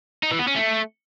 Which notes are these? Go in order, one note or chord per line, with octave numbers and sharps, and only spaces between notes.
D#4
E3
B3
C#4
A3